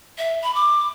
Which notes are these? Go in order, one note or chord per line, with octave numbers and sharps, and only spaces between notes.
E5
B5
D6